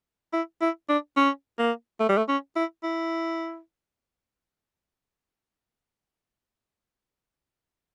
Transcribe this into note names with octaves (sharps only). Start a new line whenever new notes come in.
E4
E4
D4
C#4
A#3
A3
G3
A3
C#4
E4
E4